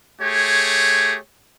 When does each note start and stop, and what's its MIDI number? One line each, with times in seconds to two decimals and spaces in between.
0.21 1.18 57
0.21 1.18 67
0.21 1.18 68
0.21 1.18 73